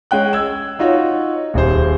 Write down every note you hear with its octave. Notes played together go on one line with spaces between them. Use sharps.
G#3 C#4 G5 F#6
E6 G#6
D#4 F4 F#4 C#5
D#1 G#4 C5